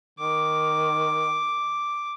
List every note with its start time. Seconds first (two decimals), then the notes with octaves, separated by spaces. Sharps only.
0.19 D#3 D6